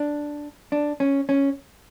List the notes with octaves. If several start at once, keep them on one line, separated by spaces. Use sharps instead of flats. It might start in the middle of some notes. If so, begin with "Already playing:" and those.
Already playing: D4
D4
C#4
C#4